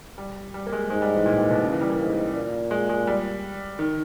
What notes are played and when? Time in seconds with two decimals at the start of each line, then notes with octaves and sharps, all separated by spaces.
0.18 G3
0.54 G3
0.67 A#3
0.72 G#3
0.90 G#2 G#3
1.02 G3
1.15 E3
1.26 A#2
1.38 A#2
1.50 B2
1.62 C#3
1.72 E3
1.81 G3
1.89 A#3
1.99 G#2
2.35 A#2
2.71 G#3
2.89 G#3
3.07 G3
3.79 D#3